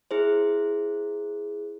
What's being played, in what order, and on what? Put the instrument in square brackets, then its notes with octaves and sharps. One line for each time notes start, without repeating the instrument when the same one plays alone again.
[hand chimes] E4 G#4 C5